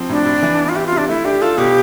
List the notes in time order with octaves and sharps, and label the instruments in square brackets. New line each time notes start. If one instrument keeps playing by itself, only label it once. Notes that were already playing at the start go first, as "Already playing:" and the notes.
Already playing: [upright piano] F3 C4
[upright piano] A2 [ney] D4
[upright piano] A2
E3
B3
[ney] F4
[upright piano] E4 [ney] G4
[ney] F4
[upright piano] C3
[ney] D4
[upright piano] A3 [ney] E4
[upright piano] D4 [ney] G4
[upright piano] F4 [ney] A4
[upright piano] B2 [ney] G4